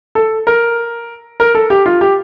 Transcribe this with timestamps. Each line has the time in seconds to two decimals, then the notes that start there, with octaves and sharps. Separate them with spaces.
0.15 A4
0.47 A#4
1.40 A#4
1.55 A4
1.70 G4
1.86 F4
2.01 G4